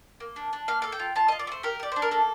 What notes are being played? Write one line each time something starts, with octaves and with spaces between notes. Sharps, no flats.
A#3
D4
D4
A#3 F5
A4 F5
G5
F4
F4 A5
F4 D#5
D5
A3 C5
G4 A#4
G4 D5
D4 C5
A#4
A#3 A4